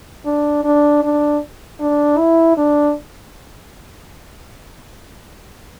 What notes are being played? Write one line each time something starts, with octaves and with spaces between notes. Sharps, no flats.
D4
D4
D4
D4
E4
D4